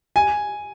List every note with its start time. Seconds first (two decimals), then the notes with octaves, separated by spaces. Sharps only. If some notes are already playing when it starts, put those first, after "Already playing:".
0.16 G#5